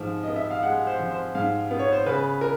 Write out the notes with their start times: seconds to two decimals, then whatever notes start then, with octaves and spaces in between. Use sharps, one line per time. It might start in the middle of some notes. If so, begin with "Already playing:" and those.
Already playing: G#2 F3
0.23 B3 D#5
0.36 E5
0.50 F5
0.63 G#3 F#5
0.87 C5
1.00 F3
1.11 C5
1.35 G#2 F5
1.71 B3
1.79 C#5
1.92 C5
2.06 C#3 B4
2.41 A#4